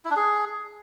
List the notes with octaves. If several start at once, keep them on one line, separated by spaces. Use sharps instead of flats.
E4
D4
G#4